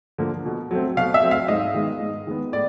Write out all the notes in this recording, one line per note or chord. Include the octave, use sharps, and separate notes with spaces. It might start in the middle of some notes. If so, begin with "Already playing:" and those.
D3 F3 A#3
B2
F#3 A3 C4
B2 F5
E5
F#3 A3 C4
F5
G#2 D#5
D#3 G#3 B3
G#2
D#3 G#3 B3
A2 D5